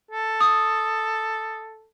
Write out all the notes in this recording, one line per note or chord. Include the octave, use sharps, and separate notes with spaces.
A4
D#6